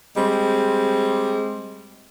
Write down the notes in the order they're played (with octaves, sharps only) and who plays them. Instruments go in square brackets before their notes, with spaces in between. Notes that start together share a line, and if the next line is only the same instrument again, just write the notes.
[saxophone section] G3 G#3 C4